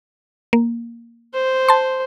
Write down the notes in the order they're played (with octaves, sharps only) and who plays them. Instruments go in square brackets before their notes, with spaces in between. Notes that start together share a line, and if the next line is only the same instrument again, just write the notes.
[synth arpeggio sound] A#3
[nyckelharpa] C5
[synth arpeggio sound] A5 C6